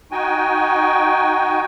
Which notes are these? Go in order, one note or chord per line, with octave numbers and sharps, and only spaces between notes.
D#4 F#4 G5 G#5